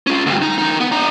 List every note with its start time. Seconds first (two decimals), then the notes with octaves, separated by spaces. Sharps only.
0.07 C#4 F4
0.26 D2 G2
0.42 D#4
0.58 E3 D#4
0.80 B3
0.92 D4 A#5